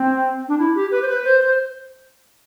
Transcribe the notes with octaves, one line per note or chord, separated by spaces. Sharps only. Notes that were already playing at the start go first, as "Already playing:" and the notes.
Already playing: C4
D4
E4
G4
B4
C5
B4
C5
C5